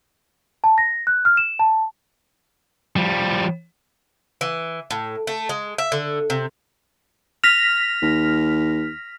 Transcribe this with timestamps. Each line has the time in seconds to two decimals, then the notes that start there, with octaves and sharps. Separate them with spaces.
0.64 A5
0.78 A#6
1.07 F#6
1.25 F6
1.37 E7
1.59 A5
2.96 F3 G3
4.41 E3
4.91 A2
5.27 A3
5.49 G#3
5.78 E5
5.92 D3
6.30 C3
7.44 F6 A#6 B6 F7
8.02 D#2